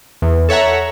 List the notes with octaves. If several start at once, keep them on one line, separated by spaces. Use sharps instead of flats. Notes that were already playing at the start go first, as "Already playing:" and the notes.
E2
A4 C#5 E5 F#5 A#5